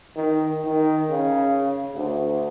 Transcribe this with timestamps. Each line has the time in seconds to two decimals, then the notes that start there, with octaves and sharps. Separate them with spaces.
0.16 D#3
0.66 D#3
1.11 C#3
1.94 D2